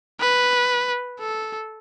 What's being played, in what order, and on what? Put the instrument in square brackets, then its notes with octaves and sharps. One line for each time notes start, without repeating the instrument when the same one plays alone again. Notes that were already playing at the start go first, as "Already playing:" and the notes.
[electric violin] B4
A4